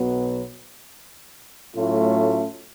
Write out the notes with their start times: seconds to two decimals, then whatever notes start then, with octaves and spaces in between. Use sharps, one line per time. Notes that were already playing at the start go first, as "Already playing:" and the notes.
Already playing: B1 B2 F#3 B3
1.75 A2 F#3 A3 C#4 F4